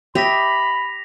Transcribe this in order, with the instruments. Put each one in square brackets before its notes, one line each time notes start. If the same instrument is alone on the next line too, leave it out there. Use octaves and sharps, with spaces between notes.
[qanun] G4 D#5 E5 [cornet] B5 [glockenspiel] A#6 B6 F7